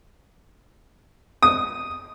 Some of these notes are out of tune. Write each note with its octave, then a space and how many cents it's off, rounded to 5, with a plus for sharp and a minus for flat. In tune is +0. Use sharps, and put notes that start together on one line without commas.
D#6 -5